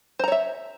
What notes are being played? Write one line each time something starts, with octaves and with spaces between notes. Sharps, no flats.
C5 C#5 E5 A#5